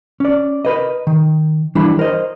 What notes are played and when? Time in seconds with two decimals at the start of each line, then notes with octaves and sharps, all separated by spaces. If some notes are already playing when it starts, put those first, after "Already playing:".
0.20 C#4 D5
0.65 A#4 B4 D#5
1.07 D#3
1.75 E3 G3 D4 E4
1.99 A#4 C5 D#5